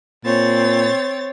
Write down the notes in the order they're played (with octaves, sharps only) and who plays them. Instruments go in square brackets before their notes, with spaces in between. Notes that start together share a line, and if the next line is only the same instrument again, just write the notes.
[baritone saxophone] A#2 [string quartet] C4 C#5 A6